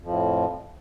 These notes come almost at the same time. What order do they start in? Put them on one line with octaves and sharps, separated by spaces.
F2 F3 A2